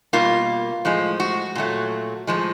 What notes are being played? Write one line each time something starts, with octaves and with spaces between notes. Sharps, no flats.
B2 G3 A#3 F4
A2 F3 G#3
F#4
A#2 F#3 A3
A2 F3 G#3